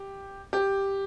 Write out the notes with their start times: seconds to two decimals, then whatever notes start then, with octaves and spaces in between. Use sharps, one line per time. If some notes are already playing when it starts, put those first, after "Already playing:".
Already playing: G4
0.53 G4